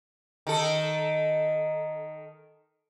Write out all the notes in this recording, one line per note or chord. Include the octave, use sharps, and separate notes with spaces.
D#3 A4